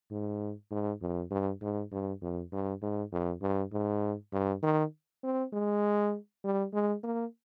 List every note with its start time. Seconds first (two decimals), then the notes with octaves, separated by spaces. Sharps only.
0.11 G#2
0.71 G#2
1.02 F2
1.31 G2
1.62 G#2
1.92 G2
2.22 F2
2.53 G2
2.82 G#2
3.12 F2
3.42 G2
3.72 G#2
4.33 G2
4.63 D#3
5.23 C4
5.53 G#3
6.44 G3
6.74 G#3
7.04 A#3